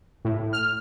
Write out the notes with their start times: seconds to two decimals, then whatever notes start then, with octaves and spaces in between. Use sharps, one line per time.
0.25 A2
0.53 F6